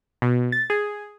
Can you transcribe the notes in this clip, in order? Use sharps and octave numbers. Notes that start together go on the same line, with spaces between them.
B2
A6
G#4